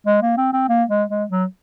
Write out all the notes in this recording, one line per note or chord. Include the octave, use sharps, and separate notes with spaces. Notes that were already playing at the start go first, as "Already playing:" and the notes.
G#3
A#3
C4
C4
A#3
G#3
G#3
F#3